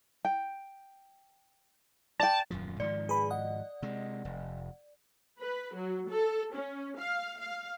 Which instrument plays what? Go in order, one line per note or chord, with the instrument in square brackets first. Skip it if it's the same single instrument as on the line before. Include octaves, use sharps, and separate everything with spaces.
[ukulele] G5
[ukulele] D5 G5 [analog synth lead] A5
[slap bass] D#1 F#2 F3
[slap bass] G#2 D#3 F3 [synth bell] D5
[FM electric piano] G#4 B4 B5
D#5 F#5
[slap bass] C3 G#3
F1
[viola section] B4
F#3
A4
C#4
F5
F5